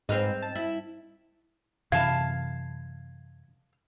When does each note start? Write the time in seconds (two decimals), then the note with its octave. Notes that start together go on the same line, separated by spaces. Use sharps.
0.09 G#2 C4 B4 D#5 F6
0.42 A5
0.55 E4
1.92 F#2 C3 E3 F5 A5 G#6